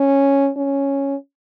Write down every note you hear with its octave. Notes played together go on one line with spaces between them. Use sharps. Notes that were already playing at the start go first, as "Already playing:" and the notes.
Already playing: C#4
C#4